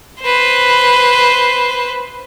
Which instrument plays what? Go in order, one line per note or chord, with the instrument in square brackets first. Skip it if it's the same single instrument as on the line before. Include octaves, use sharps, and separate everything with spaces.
[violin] B4 C5